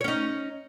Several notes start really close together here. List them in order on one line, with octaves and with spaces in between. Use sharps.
C#5 C#4 D#4